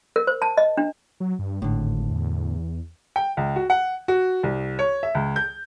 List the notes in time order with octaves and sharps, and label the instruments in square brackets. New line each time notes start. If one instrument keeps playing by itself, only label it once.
[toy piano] A#4
C5
A5
D#5
D4
[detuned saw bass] F#3
G2
[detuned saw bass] G#1 [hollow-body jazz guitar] A2 D3
[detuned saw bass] E2
[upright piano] G5
C#2
F#4
F#5
F#4
C2
C#5
E5
C#2
G6